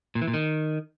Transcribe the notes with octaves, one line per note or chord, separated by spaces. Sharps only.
A#2
E3
A#2
D#3